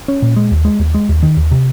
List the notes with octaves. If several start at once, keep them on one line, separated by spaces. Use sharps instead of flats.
C#4
A#2
G#3
D#2
G#3
D#2
G#3
D#2
D#3
D#2
C3